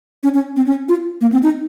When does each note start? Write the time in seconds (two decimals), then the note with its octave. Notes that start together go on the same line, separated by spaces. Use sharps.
0.23 C#4
0.34 C#4
0.56 C4
0.66 C#4
0.89 F4
1.21 A#3
1.32 C4
1.43 D#4